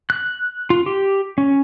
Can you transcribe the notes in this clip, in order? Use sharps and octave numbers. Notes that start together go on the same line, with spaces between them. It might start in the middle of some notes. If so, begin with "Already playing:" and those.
F#6
F4
G4
C#4